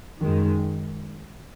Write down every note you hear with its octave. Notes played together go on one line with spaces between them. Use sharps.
F#2 D#3 G#3